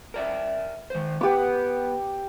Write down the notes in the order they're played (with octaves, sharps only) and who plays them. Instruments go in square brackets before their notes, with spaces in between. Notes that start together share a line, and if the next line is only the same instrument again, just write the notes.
[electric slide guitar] A#4 D5 E5
D#3 C5
[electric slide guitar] B3 B4 [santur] G4 D6